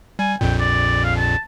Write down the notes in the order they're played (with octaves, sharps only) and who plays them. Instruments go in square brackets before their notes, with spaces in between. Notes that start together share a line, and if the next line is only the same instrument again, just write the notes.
[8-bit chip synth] G3 [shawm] G#5
[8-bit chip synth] A#1 F2 A#2 [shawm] G5
[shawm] D5
F5
A5